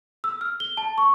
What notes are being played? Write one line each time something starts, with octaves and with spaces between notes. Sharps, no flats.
E6
F6
G7
A5
C#6